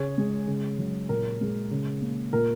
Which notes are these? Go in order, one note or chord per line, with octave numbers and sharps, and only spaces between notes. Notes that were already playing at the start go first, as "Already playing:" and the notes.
Already playing: C#3 G#4 C#5
G#3
C#3
F#3
A#2 A#4
G#3
C#3
A#3
A#2 A#4